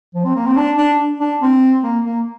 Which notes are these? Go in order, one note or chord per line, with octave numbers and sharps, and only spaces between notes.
F3
C4
A#3
C4
D4
D4
D4
C4
A#3
A#3